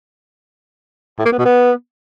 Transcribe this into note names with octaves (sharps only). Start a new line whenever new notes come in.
A2
A#3
B3
B2
B3